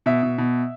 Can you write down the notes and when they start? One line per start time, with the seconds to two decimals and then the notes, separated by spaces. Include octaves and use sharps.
0.06 B2 E5
0.23 B2
0.38 B2